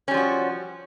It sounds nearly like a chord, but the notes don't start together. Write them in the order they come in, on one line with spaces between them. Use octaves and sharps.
C#4 G3 F3 F#4